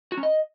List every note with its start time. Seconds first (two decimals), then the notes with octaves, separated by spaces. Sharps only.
0.12 F#4
0.17 C#4
0.23 D#5